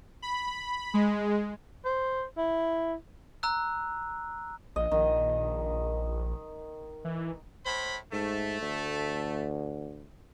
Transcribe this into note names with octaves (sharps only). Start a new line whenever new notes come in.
B5
G#3
C5
E4
A#5 E6 F#6
A#1 D#5
A#1 D#3
E3
A2 C5 B5
G#2 A3
D2